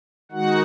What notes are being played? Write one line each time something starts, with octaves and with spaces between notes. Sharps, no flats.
D#3 G#3 D#4 F#4 F#5